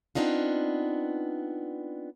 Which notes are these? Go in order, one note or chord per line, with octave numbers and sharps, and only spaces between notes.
B3 C4 D4 D#4 F4